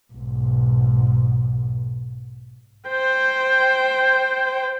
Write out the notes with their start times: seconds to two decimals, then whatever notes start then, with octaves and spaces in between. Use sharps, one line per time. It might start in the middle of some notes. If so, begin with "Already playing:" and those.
0.13 B1 G#2
2.89 C5 G5